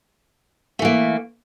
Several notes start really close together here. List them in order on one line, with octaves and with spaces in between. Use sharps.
A3 E3 A#3